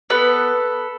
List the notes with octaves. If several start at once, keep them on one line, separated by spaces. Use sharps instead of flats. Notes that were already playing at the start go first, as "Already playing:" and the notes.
B3 A4 B4